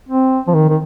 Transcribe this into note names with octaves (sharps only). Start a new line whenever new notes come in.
C4
F3
D#3
D#3